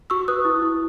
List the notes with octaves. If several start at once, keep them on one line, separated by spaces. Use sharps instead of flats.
F#4 C#6 E6
B4 D#6 F#6
E4
E4